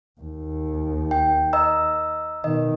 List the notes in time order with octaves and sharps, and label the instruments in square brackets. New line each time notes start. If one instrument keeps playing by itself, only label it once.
[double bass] D#2
[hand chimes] G5
D#5 A#5 E6
[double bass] B2 D#3 [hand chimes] D#5